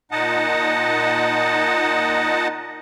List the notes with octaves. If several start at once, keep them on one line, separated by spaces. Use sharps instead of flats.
A#2 D#4 D#5 F#5 A5